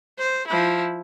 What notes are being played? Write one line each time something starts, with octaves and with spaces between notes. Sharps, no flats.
C5
F3 E4